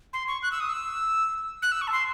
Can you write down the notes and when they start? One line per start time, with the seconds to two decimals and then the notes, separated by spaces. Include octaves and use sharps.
0.13 C6
0.27 C#6
0.42 F#6
0.51 E6
0.60 D#6
0.69 E6
1.62 F#6
1.72 E6
1.81 C#6
1.87 A5
1.92 C6